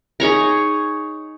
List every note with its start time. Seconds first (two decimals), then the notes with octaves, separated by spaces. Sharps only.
0.20 D#4 G#4 C#5 A#5